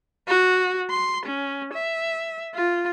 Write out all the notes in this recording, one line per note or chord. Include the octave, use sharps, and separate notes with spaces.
F#4
C6
C#4
E5
F4